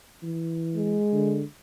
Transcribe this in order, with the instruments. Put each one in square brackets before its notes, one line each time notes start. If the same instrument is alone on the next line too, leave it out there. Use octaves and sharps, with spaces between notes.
[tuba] E3
[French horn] G#3
[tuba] D3